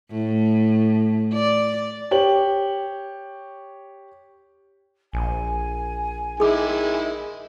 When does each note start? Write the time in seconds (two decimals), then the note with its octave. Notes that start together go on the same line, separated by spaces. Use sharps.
0.11 A2
1.34 D5
2.11 G4 C#5 F#7
5.13 A#1 G#5
6.40 D#3 G#3 E4 G#4 D6